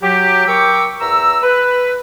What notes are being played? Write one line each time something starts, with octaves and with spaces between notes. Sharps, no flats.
F#3 G4
A#4 G5 C#6 D6 E6
E2 A#5 E6
B4